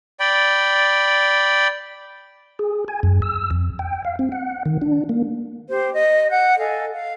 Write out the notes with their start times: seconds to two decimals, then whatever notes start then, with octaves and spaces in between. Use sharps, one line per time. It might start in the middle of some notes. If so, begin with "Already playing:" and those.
0.20 D5 G5 B5
2.59 G#4
2.88 G#5
3.03 F#2
3.22 E6
3.51 F2
3.79 G5
4.05 F5
4.19 C4
4.32 F#5
4.66 D#3
4.82 D4
5.09 A#3
5.69 G4 C5
5.93 D#5
6.30 F#5 F#6 G6
6.58 A4 D#5 F5 G#5
6.91 F5